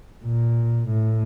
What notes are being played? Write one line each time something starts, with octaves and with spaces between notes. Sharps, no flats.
A#2
A2